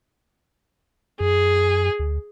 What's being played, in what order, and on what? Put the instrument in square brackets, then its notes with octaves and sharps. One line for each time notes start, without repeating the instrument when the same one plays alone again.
[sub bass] F#2 [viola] G#4
[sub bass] D2